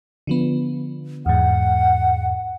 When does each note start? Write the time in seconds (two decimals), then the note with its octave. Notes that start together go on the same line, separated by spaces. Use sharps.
0.27 D3 F3 B3
1.26 E2 G#2 F#5